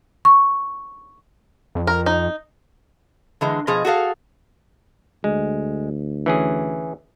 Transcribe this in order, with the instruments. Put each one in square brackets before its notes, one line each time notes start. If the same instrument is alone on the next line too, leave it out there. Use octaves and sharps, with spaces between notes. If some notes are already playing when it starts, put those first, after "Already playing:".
[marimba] C#6
[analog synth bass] F2
[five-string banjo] A#4
D#4
[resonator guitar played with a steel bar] D3 E3 G#3
B2 F3 G#4 D#5
F#4 G#4 A4 F5
[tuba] D2 [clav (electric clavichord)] G#3
[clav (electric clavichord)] E3 C#4 G#4